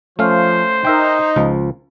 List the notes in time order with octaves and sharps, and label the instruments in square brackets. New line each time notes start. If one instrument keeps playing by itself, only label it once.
[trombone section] F3 [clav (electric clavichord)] A3 C#4 F5 [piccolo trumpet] C5
[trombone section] D#4 [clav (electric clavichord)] A#4 E5 G5
[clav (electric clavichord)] C#2 F3